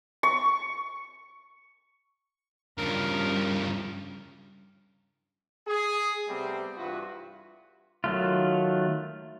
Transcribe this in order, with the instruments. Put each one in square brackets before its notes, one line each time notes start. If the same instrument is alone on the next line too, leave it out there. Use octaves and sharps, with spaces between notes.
[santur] C#6
[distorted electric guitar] G2 F3 [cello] C#3 G3 [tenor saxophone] A#4
[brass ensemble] G#4
C3 G3 A3 B3 C4
C2 G2 E3 F4 F#4 B4
[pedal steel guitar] D#3 F#3 A3 F4